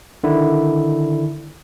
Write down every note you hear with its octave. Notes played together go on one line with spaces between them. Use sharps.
D3 D#3 E4